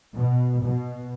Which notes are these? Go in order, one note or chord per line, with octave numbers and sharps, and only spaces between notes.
B2
B2